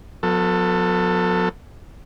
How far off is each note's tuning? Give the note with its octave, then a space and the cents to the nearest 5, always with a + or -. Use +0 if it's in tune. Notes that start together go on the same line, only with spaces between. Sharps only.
F#3 -40 B3 +15 A4 +20